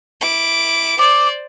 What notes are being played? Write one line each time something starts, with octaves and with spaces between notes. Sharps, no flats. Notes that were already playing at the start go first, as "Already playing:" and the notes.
E4 D6
C5 D5 D6